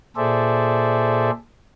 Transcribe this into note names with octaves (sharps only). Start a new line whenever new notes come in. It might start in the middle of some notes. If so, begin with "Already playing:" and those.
A#2 G#4 A4 C5 D5 E5